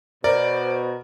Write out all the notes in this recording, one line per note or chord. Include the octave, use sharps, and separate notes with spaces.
B2 A#4 C5 D5